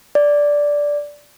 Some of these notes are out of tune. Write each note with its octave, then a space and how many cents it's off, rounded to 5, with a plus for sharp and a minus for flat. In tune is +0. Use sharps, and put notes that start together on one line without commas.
D5 -10